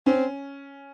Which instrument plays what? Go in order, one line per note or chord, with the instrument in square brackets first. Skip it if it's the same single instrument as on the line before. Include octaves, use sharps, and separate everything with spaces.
[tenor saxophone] C4 [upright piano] C#4